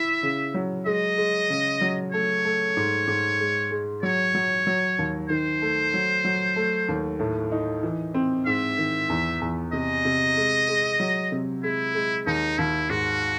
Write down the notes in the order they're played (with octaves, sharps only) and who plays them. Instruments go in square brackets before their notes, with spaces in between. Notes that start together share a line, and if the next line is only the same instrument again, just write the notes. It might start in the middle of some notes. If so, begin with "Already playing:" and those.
Already playing: [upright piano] E4 [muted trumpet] E5
[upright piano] C#3
F#3
[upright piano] G#3 [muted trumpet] D#5
[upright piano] G#3
C#3
F#3
[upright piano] A3 [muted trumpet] C#5
[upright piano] A3
G#2
G#2
G#3
G#3
[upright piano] F#3 [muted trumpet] C#5
[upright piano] F#3
F#3
D#2
[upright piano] D#3 [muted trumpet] C5
[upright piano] A3
F#3
F#3
A3
D#2
A2
D#4
E3
C4
[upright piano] G#2 [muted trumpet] E5
[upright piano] D#3
E2
E2
[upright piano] C3 [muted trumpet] D#5
[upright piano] C3
G#3
G#3
F#3
C3
[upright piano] G#3 [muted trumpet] E4
[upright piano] G#3
[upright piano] D#2 [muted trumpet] D#4
[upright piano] D#2 [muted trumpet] E4
[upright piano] G#2 [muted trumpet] F#4